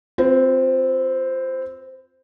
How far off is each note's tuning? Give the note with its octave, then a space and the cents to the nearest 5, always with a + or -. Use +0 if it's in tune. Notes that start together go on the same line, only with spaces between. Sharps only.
C4 +0 F4 +25 B4 +35